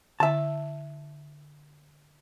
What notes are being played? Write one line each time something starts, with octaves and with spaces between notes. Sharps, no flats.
D3 E4 E5 A5